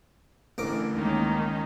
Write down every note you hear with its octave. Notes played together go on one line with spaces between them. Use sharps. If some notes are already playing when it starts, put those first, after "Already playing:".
A1 D3 E3 A#4 D6
C#2 D#3 A#3 C#4 D#4